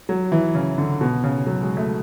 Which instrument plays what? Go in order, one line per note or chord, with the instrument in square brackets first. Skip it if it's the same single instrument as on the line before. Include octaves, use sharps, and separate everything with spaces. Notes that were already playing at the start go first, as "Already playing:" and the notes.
[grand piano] F#3
E3
C#3
D3
B2
C#3
F#3
G#3
A3